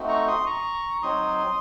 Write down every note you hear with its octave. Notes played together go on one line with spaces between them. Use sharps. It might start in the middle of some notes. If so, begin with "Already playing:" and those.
Already playing: A3 C4 D#4 F#4
A#5 C#6
C6 D#6
A#5 C#6
F#3 C4 D#4 C6 D#6